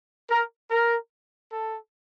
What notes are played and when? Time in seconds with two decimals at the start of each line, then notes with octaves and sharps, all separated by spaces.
0.30 A#4
0.71 A#4
1.52 A4